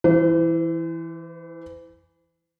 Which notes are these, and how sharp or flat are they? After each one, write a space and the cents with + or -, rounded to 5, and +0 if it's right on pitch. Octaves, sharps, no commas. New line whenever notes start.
E3 +0 C5 -45